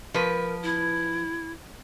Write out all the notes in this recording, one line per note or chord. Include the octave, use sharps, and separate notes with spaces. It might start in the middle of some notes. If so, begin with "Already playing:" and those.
F3 A#4 B4
E4